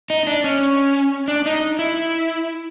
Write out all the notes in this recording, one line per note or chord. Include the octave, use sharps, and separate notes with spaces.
D#4
D4
C#4
D4
D#4
E4